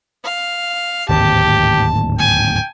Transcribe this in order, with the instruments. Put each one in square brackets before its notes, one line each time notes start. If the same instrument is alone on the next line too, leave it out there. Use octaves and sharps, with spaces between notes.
[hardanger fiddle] F5
[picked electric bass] D1 G#1 D#2 [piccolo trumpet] G4 [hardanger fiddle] A5
[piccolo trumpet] G5 [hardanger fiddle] G#5